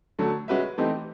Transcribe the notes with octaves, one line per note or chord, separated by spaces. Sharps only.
D3 F#3 A3 C#4
G#3 C#4 F#4 B4 E5
E3 A3 C4 D#4 G4